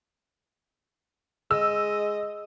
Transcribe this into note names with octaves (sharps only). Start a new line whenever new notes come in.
G#3 D#5 E6